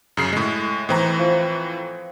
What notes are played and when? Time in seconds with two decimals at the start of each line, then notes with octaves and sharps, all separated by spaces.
0.17 F#2 C#3 C7
0.33 A2 G#3
0.89 A2 E3 C4 A#5
1.19 F3